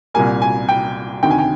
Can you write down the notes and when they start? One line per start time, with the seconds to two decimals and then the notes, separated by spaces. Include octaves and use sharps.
0.14 C2 A#2 G3 A#3 G#5
0.42 G#5
0.69 G5
1.23 D2 C3 D#3 G5
1.31 G#5
1.39 G5